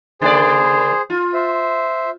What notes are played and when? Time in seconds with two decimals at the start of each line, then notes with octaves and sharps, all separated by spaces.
0.21 C#3 A#3 G#4 C5 D5
1.10 F4
1.34 C5 E5